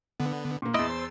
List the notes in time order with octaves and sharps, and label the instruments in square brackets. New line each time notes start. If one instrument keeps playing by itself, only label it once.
[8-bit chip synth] D3 B3
[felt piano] A#2 A#3
[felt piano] E2 D7 [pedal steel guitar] E4 D#5 [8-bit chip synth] C6 E6 A6
[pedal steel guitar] C5